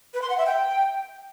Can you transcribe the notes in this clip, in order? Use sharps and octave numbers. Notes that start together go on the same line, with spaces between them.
B4
C6
F#5
E5
G5